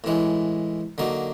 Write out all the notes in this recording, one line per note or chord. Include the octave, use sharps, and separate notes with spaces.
A2 E3 G#3
D3 F#3 A#3 D#4